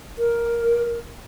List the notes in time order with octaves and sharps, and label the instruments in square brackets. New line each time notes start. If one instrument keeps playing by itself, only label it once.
[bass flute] A#4